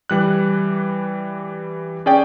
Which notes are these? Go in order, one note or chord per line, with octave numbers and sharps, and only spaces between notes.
E3 G3 F#6
C#4 G#4 D5 G5